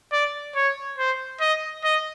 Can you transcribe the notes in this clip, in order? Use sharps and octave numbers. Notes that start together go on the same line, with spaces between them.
D5
C#5
C5
D#5
D#5